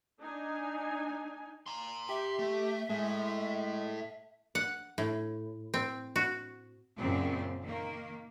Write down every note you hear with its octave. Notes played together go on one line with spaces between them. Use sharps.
D4 D#4 G#5
A#5 C6
G4 E5
A3
A2 G#3
F#5
A2
C4
F#4
F#2 A#2 C#3 C4
D#3 A#3